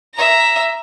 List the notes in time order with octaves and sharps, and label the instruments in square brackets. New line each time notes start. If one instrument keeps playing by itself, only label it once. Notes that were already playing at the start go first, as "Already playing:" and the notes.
[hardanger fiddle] E5 A#5